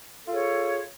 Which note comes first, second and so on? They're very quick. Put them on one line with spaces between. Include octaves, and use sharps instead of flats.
A4 F4 G#4 C#5 C5